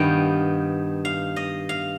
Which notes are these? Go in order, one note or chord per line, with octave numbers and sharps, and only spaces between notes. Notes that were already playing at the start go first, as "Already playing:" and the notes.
Already playing: G2 D#3 B3 F5 G5
F5
D#5
F5